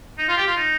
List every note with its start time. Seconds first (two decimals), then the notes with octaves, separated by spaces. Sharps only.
0.18 D#4
0.29 F4
0.37 G4
0.47 F4
0.57 D#4